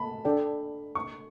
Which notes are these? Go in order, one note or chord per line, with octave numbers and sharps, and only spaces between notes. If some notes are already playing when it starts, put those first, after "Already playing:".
Already playing: A5 B5
D4 A4 D5 G5
C#6